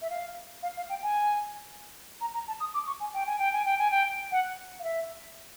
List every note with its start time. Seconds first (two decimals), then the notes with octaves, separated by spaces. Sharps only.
0.02 E5
0.10 F5
0.63 F5
0.77 F5
0.89 G5
1.03 G#5
2.21 A#5
2.34 A#5
2.48 A5
2.60 D#6
2.74 D6
2.87 C#6
3.00 G#5
3.14 G5
3.26 G#5
3.39 G5
3.53 G#5
3.65 G5
3.79 G#5
3.91 G5
4.32 F#5
4.80 F5
4.84 E5